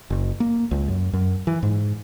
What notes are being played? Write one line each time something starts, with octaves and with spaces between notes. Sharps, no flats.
F#1
A#3
C#2
F#2
F#2
E3
G#2